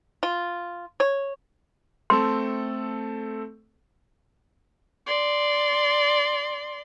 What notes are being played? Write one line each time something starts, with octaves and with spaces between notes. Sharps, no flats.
F4
C#5
A3 C4 A4 C6
D5 C6